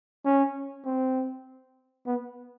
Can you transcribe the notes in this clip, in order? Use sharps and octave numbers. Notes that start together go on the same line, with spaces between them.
C#4
C4
B3